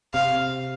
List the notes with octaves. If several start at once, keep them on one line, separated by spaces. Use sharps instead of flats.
C3 F5